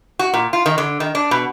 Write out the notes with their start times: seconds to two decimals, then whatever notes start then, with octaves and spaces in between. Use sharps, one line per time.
0.19 F#4
0.34 A#2
0.53 F4
0.66 D#3
0.78 D3
1.00 D#3
1.15 D4
1.31 B2